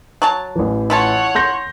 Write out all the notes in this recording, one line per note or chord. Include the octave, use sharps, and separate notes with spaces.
F#3 C#5 A5
A1 E3
E4 F4 A4 C#5 F#5
C6 G6 A#6